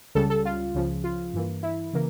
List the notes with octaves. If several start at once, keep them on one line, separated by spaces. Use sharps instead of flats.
C#2 C#3 G3 A4
A4
F4
C#2 C#3 F3
F4
G2 E3 A#3
E4
C#3 E3 A#3